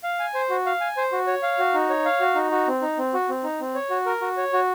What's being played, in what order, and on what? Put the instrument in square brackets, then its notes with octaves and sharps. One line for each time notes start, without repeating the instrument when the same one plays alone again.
[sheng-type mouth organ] F5
G#5
C5
F#4
F5
G#5
C5
F#4
C#5
F5
F#4
D#4
C#5
F5
F#4
D#4
F#4
C4
D#4
C4
F#4
C4
D#4
C4
C#5
F#4
A#4
F#4
C#5
F#4